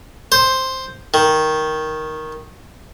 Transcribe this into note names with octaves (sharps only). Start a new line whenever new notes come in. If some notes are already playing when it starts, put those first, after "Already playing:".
C5
D#3